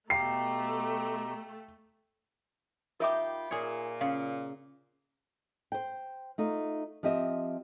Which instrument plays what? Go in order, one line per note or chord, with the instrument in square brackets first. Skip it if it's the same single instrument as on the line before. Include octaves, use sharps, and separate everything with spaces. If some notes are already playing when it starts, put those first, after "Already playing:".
[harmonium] B2 G4 A#5 [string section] A3 [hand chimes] F5 G5 [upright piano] C7
[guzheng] D#4 G4 [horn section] F4 G5 B5 [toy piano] A#4 E5 D6
[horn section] A#2 [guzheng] G#4 C#5
[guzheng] C#3 [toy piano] F5
[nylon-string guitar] C5 G5
A3 D#4 F4
F3 C4 G4 D#5 E5